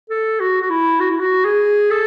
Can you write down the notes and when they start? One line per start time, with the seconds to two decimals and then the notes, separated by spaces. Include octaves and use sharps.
0.10 A4
0.40 F#4
0.62 F#4
0.70 E4
1.00 F#4
1.10 E4
1.19 F#4
1.45 G#4
1.91 A4